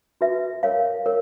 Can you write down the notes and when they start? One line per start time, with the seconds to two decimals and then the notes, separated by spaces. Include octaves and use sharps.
0.21 F#4 B4 E5
0.63 A#4 C#5 F5
1.06 A#4 C#5